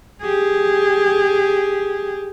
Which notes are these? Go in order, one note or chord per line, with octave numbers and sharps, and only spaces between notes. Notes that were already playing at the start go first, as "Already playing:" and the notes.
G4 G#4